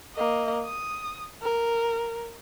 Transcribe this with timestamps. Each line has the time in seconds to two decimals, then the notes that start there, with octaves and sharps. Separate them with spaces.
0.16 A#3 D#5
0.64 D#6
1.42 A#4